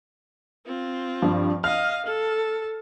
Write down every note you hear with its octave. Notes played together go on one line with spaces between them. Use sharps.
C4 F4
G2 F3
D#5 F5 F6
A4